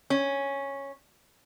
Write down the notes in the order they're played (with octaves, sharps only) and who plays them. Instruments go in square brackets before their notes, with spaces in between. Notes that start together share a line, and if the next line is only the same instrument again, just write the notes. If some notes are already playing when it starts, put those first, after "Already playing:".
[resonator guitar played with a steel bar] C#4